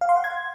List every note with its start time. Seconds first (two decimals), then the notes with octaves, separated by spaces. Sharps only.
0.01 F5
0.09 C6
0.16 F#5
0.24 G#6